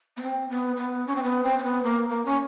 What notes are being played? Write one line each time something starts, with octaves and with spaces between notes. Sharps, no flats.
B3
C4
B3
B3
C#4
C4
B3
C4
C4
B3
A#3
A#3
C#4